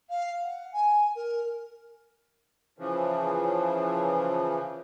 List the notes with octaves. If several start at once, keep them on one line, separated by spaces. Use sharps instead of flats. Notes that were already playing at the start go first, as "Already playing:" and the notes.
F5
F#5
G#5
A#4
C#3 E3 F3